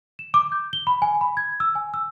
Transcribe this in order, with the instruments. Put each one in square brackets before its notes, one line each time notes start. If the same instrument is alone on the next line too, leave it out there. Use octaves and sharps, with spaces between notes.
[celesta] E7
D6
G6
G7
B5
G#5
B5
G#6
E6
G#5
E6